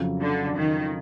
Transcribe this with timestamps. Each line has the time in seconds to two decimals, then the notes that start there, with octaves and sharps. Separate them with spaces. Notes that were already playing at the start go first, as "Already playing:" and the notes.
Already playing: F2 C#3 F#3
0.20 D3
0.57 D#3